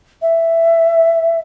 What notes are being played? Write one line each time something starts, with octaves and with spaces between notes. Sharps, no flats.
E5